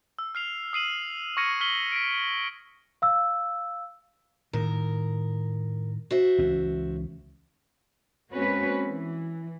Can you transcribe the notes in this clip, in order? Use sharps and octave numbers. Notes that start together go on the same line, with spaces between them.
E6
F6 C7 F7
D#6 C7 D#7 F#7
C#6 F6 G#6 A#6 C#7 D#7
C#6 F6 B6 F#7 G7
B6 D7
F5 E6
A2 D#3 A#4
F#4 C5 E5
C#2 E3 C#4
G#3 A#3 C4 C#4 F#4 B4
E3